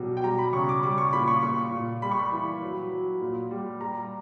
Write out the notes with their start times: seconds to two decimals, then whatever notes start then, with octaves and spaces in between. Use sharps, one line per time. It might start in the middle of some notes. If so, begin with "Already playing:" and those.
Already playing: B2 F#3 G3
0.17 G5
0.24 G3 A#5
0.39 B5
0.53 C#3 C#6
0.69 D6
0.83 G3 D6
0.98 C#6
1.13 A#2 B5
1.28 C#6
1.42 A#2 C#6
1.72 A#2
2.02 G3 B5
2.11 C#6
2.19 B5
2.32 E3
2.62 F#3
2.92 F#3
3.21 A#2
3.51 G3
3.81 G3 A#5